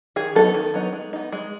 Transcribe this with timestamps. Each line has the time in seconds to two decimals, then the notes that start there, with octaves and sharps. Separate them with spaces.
0.16 D#3 G#4
0.35 F#3 B3 D#4 A4
0.54 D#3
0.74 F#3 B3 D#4
0.93 G#3
1.13 B3 D#4
1.32 G#3